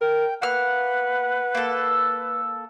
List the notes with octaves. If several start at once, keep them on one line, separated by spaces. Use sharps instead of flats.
A#4 G5
A#3 B4 F#5 F6
A#3 A4